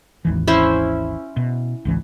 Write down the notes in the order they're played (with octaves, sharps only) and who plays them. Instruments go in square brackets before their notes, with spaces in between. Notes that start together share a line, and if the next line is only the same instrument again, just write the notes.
[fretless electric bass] G#1 D#2 E3
[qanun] C#4 E4 C5
[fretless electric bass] B2
G#1 C#2 E3